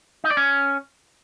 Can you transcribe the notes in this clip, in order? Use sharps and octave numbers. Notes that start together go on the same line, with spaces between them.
D#4
D5
C#4